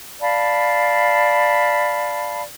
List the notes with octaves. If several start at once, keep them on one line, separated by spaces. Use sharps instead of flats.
D5 F5 A5 B5